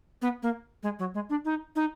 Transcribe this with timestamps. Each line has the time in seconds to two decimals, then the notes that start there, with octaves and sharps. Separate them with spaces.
0.22 B3
0.43 A#3
0.83 G#3
0.99 F#3
1.14 G#3
1.30 D4
1.45 D#4
1.76 D#4